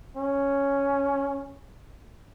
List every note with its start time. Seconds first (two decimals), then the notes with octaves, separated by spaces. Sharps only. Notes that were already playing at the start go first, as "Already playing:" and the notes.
0.17 C#4